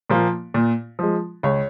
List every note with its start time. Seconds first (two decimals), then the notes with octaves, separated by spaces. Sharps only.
0.10 A#2 F3 A#3
0.54 A#2
0.99 F3 G#3
1.43 C#2 C#5